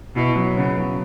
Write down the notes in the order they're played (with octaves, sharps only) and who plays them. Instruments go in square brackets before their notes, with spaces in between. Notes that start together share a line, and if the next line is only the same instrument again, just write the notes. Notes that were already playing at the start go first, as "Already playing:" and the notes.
[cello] B2 [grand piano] E4
[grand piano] F#3
[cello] C#3 [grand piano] B3
[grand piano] F#3